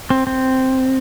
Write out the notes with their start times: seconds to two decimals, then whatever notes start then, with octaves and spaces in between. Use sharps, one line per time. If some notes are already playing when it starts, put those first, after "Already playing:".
0.10 C4
0.27 C4